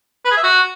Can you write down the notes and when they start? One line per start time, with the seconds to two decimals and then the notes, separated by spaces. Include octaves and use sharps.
0.25 B4
0.31 G#4
0.37 E5
0.43 F#4